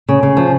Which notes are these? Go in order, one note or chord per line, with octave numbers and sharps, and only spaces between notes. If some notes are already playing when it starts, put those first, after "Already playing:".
C#3
C#3
F3